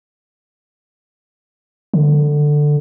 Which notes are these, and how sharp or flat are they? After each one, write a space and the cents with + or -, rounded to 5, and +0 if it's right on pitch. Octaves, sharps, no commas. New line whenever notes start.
D3 +10